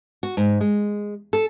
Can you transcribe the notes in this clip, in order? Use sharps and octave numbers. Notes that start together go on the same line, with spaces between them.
F#4
G#2
G#3
A4